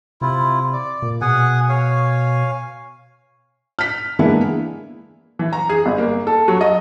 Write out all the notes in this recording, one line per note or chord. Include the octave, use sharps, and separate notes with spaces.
C3 E4 F4
D5
A#2
B2 G#4 F#5 G#5
C#5 F5 G#5
F6 B6
E3 G#3 A#3 B3 D4 E4
E3
A#5
G#4
G1
A#3
A4
F#3
D#5